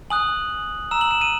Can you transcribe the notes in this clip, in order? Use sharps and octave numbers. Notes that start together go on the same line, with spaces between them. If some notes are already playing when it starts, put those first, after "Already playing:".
G#5 D#6 F#6 F#7
A#5 E6 E7
F#7
E7
D#7